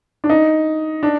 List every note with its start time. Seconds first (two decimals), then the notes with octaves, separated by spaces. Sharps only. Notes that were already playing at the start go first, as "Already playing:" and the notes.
0.24 D4
0.29 D#4
1.03 D4